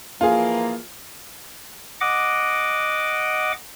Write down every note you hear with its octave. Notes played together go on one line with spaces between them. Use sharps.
E3 F3 A#3 F4 G#4
D#5 F#5 D6